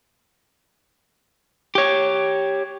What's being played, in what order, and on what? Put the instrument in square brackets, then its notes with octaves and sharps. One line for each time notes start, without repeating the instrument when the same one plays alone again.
[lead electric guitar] G4 C#5